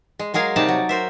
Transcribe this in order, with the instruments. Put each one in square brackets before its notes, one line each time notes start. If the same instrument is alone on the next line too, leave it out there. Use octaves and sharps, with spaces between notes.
[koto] G#3
F#3 G#3 G#4 A#4 F5
C3 G3 D#4 D5 A5
F#3
A#4 C5 E5